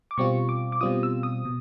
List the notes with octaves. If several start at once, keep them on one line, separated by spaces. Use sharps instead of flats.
D6
B2 G3 C4 F4 C#6
D6
D6
B2 G3 C4 F4 D#6
E6
D#6
B2